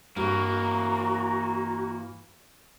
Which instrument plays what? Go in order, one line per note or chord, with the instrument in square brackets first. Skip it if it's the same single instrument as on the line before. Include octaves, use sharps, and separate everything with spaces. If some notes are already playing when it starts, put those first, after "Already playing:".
[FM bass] G2 [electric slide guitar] E3 A#3 [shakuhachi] F#4 [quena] A#5